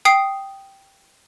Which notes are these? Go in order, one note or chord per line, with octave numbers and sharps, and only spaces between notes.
G5 D#6 C7